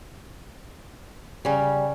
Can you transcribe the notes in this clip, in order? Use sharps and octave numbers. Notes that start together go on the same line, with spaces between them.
C#3 G3 C#4